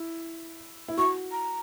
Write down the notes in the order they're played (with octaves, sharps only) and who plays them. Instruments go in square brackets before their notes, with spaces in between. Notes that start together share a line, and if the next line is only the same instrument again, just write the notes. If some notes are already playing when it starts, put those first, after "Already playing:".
Already playing: [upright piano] E4
E4
[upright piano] F#4 [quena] C#6
[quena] A#5